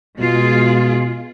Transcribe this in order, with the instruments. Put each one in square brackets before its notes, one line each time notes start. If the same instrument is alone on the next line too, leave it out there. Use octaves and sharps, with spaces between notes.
[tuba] B2 [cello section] G#3 F4 G#4